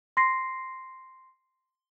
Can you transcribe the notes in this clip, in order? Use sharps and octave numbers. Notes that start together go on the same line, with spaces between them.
C6 A#6 C7